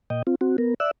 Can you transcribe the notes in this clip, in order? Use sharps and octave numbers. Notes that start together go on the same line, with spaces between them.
A#2 D#5 G5
C4 F4
C4 F#4
B3 A#4
D5 E5 E6 F#6